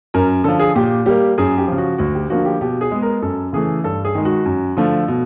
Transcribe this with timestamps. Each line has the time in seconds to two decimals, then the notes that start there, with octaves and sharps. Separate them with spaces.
0.14 F#2 A#4
0.44 D3 F3 A4
0.60 G#4
0.75 A#2 G4
1.06 G3 A#3 G4
1.38 F#2 G#4
1.58 G4
1.68 C#3 F3
1.78 F#4
1.98 D2 F#4
2.14 G4
2.30 D3 F3 A#3 F#4
2.45 G4
2.61 B2 G4
2.81 G#4
2.91 G#3 B3
3.02 A#4
3.22 F#2 A4
3.53 C#3 E3 A3 G#4
3.84 G2 A4
4.05 G#4
4.15 D#3 G#3
4.25 F#4
4.45 F#2
4.77 D3 F3 A3
5.08 B2